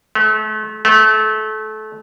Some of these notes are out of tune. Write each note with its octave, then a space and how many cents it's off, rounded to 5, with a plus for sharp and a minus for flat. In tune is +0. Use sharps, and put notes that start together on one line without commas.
A3 -35
A3 -25